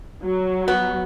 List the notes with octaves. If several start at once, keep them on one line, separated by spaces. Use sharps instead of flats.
F#3
B3